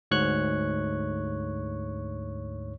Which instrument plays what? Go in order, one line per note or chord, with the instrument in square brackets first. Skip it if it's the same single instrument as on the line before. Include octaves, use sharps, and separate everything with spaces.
[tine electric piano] D2 G#2 C#5 C#6 F#6